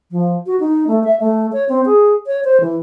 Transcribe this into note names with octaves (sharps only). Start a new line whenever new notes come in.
F3
F#4
D#4
A3
E5
A3
C#5
C4
G#4
C#5
C5
E3